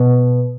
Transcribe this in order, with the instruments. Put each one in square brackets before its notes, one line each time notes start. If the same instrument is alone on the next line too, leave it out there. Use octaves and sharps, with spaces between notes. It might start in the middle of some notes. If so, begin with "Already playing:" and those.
Already playing: [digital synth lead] B2